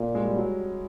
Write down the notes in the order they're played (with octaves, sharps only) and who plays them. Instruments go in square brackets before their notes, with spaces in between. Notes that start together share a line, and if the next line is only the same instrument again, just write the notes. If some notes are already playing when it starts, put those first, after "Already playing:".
Already playing: [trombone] A#2
[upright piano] G#3
G3
F#3